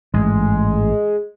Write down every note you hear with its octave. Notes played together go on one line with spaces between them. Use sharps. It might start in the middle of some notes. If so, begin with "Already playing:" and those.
A1 G#2 G#3